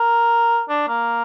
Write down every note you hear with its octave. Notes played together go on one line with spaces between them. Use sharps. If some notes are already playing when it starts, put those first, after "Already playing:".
Already playing: A#4
D4
A#3